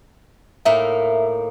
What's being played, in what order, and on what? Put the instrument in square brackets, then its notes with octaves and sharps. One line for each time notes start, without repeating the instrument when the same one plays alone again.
[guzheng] A2 A#3 D#4 [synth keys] E5